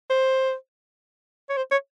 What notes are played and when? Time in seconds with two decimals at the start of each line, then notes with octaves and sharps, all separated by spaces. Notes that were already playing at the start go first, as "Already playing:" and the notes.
0.10 C5
1.49 C#5
1.57 C5
1.71 C#5